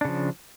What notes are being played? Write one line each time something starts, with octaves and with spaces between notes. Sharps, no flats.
C#3 F3 D4